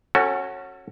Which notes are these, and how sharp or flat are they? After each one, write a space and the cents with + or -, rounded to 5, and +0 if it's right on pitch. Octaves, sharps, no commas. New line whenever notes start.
C#4 -20 F#4 +0 A4 +25